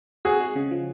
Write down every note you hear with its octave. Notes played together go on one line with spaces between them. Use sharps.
C4 F#4 G#4
G#3
C#3
F3